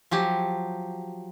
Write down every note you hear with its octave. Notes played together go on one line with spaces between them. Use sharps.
F3 F#3 G4